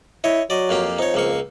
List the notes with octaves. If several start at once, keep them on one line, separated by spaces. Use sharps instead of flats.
E4 C#5 D#5
F#3 D5 D#5
F2 A#3 G4
F2 D#4 C#5
C#2 A#3 C#6